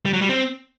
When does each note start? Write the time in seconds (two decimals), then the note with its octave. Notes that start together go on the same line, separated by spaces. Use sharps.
0.05 G3
0.13 F#3
0.21 G3
0.29 C4